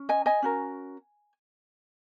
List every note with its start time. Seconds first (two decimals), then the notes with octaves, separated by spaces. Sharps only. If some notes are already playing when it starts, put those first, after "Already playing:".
Already playing: C#4
0.09 D#5 G#5
0.26 D#5 G#5
0.42 C#4 F#4 A#4